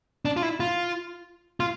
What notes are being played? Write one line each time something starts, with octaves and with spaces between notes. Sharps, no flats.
D4
F4
E4
F4
F4